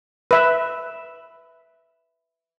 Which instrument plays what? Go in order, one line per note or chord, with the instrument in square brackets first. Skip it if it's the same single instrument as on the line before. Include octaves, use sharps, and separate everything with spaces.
[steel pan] B4 E5